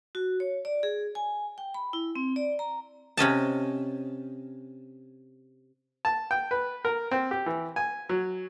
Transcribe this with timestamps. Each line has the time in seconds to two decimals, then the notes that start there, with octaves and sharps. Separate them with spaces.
0.15 F#4
0.40 C#5
0.65 D5
0.83 G#4
1.15 G#5
1.58 G5
1.74 B5
1.93 E4
2.15 C4
2.36 D5
2.59 A#5
3.17 C3 C#4 D#5 A5
6.05 A5
6.31 G5
6.51 B4
6.85 A#4
7.11 C4
7.31 G4
7.46 E3
7.76 G#5
8.09 F#3